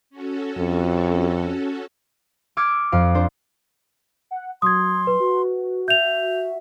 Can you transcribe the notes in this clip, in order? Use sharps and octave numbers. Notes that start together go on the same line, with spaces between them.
C#4 F#4 A4
F2
D6 E6 F6 G#6 C#7 D7
F2 F5 D7
D4 C5
F#5
F#3 C6 D#6 G#6
B4
F#4
E5 G6 F7